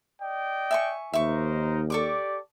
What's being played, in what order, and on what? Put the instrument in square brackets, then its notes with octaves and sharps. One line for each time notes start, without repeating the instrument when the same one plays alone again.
[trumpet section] D5 D#5 G5
[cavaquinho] E5 G#5 C#6
[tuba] D#2 [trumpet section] D#4 A#4 C5 [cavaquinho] E5 C#6
[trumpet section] G4 D5 [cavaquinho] A4 C#6 D6